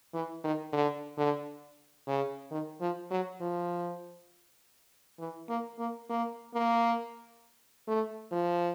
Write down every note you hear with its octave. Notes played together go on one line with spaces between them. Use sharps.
E3
D#3
D3
D3
C#3
D#3
F3
F#3
F3
E3
A#3
A#3
A#3
A#3
A3
F3